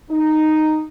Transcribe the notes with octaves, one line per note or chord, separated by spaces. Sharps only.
D#4